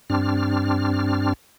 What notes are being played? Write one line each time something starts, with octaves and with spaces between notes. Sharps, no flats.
G2 C4 D4 F6